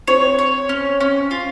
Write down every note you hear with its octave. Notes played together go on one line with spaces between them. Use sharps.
C4 C#5
C#5
C#4
C#4
F4